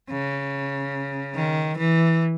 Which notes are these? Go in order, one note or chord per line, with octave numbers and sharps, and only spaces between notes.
C#3
D#3
E3